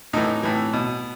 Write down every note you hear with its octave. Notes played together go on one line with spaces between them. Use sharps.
A2 E3 D#4
A2 E3
B2